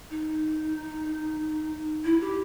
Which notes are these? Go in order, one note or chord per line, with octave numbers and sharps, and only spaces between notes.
D#4
E4
G4